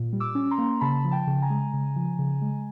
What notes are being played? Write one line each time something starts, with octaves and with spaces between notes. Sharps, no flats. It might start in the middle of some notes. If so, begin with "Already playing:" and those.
Already playing: A#2
G3
D6 E6
C#4
A#5 C6
A#3
C#3 A5 B5
F3
G5 A5
C#3
G#5 A#5
G#3
C#3
F3
C#3
G#3